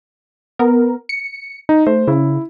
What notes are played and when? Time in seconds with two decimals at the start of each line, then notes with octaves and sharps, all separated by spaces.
0.59 B3 A#4
1.09 C#7
1.69 D#4
1.87 A3 C5
2.08 C#3 E4